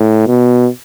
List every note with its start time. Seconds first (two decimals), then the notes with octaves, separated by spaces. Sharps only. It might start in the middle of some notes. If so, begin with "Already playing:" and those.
Already playing: A2
0.27 B2